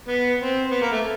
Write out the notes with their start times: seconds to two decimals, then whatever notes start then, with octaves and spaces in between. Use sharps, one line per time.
0.09 B3
0.40 C4
0.71 B3
0.82 A#3
0.92 A3